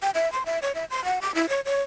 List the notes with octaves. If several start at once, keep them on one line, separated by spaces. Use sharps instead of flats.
G5
E5
C6
E5
C#5
E5
C6
F#5
D6
E4
C#5
C#5